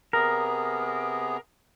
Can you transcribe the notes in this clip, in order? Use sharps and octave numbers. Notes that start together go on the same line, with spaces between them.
C3 B3 G#4 A#4